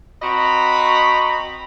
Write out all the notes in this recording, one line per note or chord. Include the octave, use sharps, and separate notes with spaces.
C4 F#4 D#5 A#5 B5